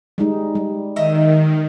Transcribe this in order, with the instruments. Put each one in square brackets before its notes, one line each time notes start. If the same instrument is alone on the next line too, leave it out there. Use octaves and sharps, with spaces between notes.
[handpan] G3 G#3 D#4
G3
[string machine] D#3 [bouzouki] D#5 E5 A#5